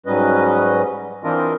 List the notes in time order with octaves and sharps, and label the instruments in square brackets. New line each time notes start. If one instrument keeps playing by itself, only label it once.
[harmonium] G#2 F#3 G3 C#4 B4 D#5
E3 C4 D4 F4 A#4 D#5